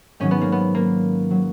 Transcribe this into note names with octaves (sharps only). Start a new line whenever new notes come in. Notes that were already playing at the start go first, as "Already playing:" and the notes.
G#2 D#3 F#3 C#4
B3
A#3
B3
A#3
F#3